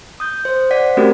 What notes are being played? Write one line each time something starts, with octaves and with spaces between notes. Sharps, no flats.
D#6 G6
C5
C5 D5 F#5 B6
A3 C4 C#4 F#4 G4 A#4